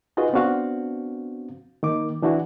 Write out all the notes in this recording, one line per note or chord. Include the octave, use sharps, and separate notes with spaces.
D#4 F4 F#4 G#4 B4 D#5
B3 C4 D4 F#4 F5
D#3 A#3 D6
E3 D4 E4 F#4